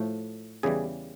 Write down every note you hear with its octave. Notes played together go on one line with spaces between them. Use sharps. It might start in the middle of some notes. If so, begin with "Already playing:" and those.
Already playing: A2 F3 A3
E2 C#3 E3 G3 G#4